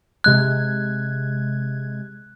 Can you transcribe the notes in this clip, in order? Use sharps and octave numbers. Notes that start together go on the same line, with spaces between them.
C3 G#3 F#6 G#6